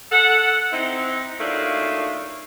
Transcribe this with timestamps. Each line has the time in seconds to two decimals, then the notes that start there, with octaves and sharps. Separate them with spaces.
0.11 A4 F#5
0.72 C4 D#4 E4
1.40 F#3 A3 A#3 D4 D#4 F4